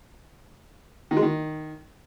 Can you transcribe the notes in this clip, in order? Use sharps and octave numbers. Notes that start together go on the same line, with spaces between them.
D#3
G#3
D#3